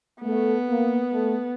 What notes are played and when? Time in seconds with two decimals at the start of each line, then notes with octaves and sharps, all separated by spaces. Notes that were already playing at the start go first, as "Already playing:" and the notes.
0.22 A3 B3
0.68 A#3
1.12 A3